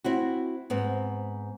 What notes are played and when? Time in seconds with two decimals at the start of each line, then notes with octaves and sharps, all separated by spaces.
0.04 C4 E4 F#4
0.70 G#2 B3 C4